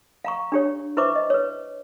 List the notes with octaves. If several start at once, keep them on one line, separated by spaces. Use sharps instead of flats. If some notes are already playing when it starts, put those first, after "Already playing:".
F5 A#5 C#6
D4 G4 C#5
E4 B4 C5 E5 C#6 D6
D#5
B4 C#5